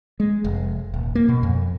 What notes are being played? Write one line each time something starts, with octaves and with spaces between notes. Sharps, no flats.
G#3
F1
D#1
A#3
B2
F2